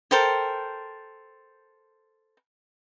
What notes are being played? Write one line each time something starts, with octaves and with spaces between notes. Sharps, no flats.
A4 A#4 C5 G5